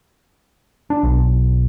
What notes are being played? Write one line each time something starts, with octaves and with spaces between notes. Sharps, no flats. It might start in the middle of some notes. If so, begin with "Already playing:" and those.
D4
B1